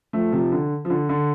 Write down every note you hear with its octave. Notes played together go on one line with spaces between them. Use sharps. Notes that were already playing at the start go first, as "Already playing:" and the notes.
F3 A3
C3 F3
D3
F3
D3
D3